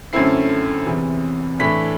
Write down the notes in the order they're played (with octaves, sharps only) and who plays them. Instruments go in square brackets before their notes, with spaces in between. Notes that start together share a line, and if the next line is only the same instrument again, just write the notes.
[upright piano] F#2 D3 A3 C4 E4 C7
E2 C3 E3
A2 E3 A3 D4 B6